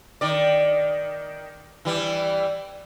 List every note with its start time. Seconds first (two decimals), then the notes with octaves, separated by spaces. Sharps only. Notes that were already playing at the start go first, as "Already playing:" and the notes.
0.21 D#3 D5
1.85 E3 G3